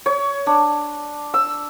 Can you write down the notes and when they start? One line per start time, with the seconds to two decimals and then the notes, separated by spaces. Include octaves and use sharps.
0.06 C#5
0.47 D4
1.34 E6